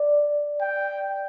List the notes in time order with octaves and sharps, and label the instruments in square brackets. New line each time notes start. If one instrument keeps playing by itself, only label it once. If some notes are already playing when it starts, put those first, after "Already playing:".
Already playing: [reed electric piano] D5
[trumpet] G5